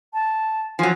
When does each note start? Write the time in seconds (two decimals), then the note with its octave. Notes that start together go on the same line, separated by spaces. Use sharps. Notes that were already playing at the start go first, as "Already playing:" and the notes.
0.14 A5
0.79 F3 F#3 G#5